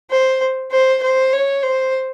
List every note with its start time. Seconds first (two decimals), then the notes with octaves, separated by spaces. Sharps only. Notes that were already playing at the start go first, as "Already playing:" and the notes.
0.10 C5
0.71 C5
1.02 C5
1.32 C#5
1.63 C5